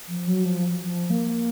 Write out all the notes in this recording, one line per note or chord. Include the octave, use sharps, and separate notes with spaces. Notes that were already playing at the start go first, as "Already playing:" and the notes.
F3
F#3
F3
F3
A#3